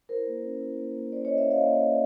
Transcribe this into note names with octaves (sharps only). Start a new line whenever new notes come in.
E4 A#4 C5
A#3
C#4
E4
A#3
A#3
C#4 C5 D5
C#4 C#5 D#5
D5 E5
C#4 D#5 F5
A#3
A#3